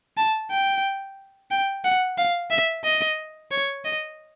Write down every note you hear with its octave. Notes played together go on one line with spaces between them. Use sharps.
A5
G5
G5
F#5
F5
E5
D#5
C#5
D#5